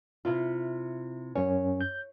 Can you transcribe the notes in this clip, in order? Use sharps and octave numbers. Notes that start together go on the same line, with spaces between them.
C3 E4 F4
F#2 C#4 C#5
G6